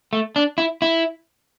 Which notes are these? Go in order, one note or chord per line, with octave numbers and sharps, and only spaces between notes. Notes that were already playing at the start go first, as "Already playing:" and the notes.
A3
D4
E4
E4